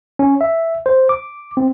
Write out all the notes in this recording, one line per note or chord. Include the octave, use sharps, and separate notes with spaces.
C#4
E5
C5
D6
C4